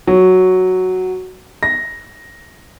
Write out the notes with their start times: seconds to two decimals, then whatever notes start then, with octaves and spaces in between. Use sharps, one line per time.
0.07 F#3
1.63 A#6